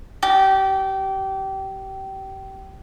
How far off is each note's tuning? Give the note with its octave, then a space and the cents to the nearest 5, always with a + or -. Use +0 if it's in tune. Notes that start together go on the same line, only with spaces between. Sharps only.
G4 -25